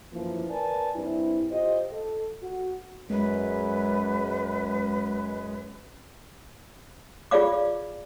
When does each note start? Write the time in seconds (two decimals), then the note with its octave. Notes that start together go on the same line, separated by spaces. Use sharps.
0.13 F#2 E3 F3 A#3 E4
0.50 A#4 B4 D5 G#5 A5
0.95 G2 C4 E4
1.51 F4 G4 C5 D#5
1.92 A4
2.42 F#4
3.10 F#2 G#3 B4
7.31 F4 G#4 D5 F5 D6